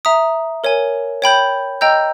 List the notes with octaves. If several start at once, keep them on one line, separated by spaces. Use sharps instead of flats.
E5 A#5 D#6
A#4 C#5 G#5
C#5 G5 B5 G6
D#5 G5 A#5 E6 G6